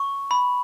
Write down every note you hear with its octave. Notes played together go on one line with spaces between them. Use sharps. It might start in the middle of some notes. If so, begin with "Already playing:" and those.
Already playing: C#6
B5